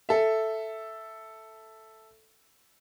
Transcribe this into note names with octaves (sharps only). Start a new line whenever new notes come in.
A4 E5